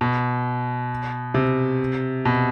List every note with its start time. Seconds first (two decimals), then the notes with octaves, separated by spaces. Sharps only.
0.01 B2
1.34 C3
2.25 B2